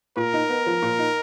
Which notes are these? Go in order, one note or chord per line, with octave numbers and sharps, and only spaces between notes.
A#2 A#4
D#4
B3
F3
A#2
D#4